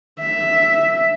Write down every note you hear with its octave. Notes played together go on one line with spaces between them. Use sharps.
E5